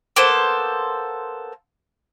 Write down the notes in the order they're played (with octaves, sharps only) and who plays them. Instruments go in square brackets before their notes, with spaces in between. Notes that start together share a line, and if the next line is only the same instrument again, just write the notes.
[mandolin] A#3 B3 A4 C5